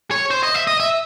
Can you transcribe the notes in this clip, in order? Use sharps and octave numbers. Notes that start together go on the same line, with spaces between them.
C#5
C5
D#5
E5
D#5
E5